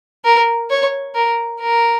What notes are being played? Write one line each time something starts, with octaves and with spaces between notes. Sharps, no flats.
A#4
C#5
A#4
A#4